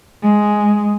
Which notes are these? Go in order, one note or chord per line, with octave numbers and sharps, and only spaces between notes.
G#3